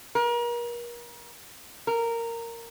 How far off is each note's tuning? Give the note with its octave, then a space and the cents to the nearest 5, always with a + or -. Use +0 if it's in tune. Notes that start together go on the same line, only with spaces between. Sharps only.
A#4 +35
A#4 -10